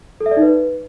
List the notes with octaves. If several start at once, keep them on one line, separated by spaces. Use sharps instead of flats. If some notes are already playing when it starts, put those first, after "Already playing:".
A4
E5
D5
D#4
B4